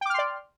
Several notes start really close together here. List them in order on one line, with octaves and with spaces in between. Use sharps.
G5 D6 F6 C6 D5